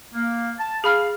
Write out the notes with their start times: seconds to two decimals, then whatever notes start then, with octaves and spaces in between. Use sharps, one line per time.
0.13 A#3
0.59 A5
0.84 G#4 F5 B5 F6